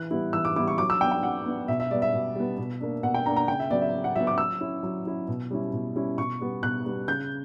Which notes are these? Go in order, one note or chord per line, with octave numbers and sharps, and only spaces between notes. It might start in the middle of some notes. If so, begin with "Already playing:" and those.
Already playing: E3 F#6
G3 B3 E4
E3 E6
D6
G3 B3 E4 D6
C#6
F#3 D6
E6
B3 D4 G5
G5
F#3 F#5
B3 D4
B2 E5
E5
G3 B3 D5
E5
B2
G3 B3
B2
A#3 D4
B2 F#5
G5
A#3 D4 A#5
A#5
C#3 G5
E5
F#3 B3 D5
E5
C#3
F#5
F#3 B3 E5
D6
F#3 E6
C#4 E4
F#3
C#4 E4
B2
G3 C#4 E4
B2
G3 C#4 E4
B2 C#6
G3 B3
B2 F#6
G3 B3
C#3 G6